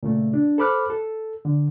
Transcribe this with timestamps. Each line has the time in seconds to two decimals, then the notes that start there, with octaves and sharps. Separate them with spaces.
0.03 A#2 C#3 A3
0.34 D4
0.58 A4 C5 B5 D6 F6 F#6
0.90 A4
1.45 D3